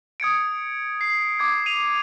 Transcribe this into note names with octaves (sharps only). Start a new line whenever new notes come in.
D#6 G#6 C#7 D7
C7
D6 G#6
D#7 F7